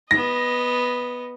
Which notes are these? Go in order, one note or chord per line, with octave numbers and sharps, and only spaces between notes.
B3 D#5 A#6